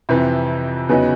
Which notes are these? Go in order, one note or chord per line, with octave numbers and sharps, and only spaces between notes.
F2 C3 E3
E2 C#3 F#3 B3 D#4